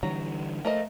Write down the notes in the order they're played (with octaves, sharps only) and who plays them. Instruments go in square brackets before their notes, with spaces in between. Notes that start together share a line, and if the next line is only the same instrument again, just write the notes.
[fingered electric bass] D3 E3 G3 [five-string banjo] F#3
[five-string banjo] F3 A#3 D#5 [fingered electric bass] A3